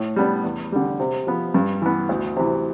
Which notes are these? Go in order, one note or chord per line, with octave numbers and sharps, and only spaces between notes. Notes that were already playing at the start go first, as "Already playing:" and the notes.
Already playing: A2
G3 B3 D4
E2
D3 G3
C3
F3 B3
G2
E3 B3
D2
C3 E3